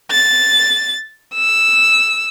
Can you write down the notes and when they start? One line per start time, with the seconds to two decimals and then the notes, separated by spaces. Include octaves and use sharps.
0.11 A6
1.35 E6